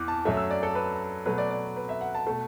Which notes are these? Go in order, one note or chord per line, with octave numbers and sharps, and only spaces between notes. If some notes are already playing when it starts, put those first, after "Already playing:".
Already playing: E2 E3 D6
A5
F#2 F#3 A3 E5
E6
D5
A4
B4
B2 F#3 A3 B4
D5
D5
B4
E5
F#5
A5
B2 A3